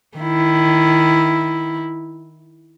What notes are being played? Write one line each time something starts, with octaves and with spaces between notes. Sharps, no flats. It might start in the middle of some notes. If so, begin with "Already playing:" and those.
D#3 E4